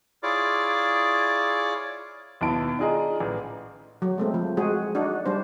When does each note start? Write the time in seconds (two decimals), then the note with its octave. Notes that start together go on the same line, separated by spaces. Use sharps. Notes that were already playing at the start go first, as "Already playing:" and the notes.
0.23 E4 F4 G#4 C#5 D5 D6
2.41 D#2 B2 E4 A5 D7
2.79 D4 F4 G#4 D#5 A#5
3.20 A1
4.02 F#3
4.18 G#3 A3 C4
4.34 F3
4.57 G#3 F#4 G#4
4.95 D4 D#4 F#4
5.26 G3 D4 C5